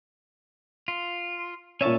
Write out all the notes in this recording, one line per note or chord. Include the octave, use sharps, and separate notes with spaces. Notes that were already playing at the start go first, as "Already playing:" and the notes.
F4
A#2 C#4 C#5 E5 A5